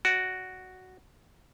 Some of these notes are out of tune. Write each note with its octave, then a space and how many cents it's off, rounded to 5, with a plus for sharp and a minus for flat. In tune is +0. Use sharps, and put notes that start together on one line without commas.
F#4 +0 D5 -5